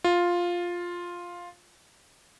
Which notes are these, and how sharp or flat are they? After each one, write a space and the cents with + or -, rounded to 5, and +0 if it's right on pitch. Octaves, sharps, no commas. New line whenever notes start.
F4 +5